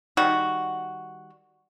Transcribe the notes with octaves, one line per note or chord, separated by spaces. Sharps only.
D#3 G3 F#4